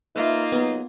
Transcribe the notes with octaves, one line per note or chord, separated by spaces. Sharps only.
A#3 D#4 F4 B4 D#5 E5
F#3 B3 G#4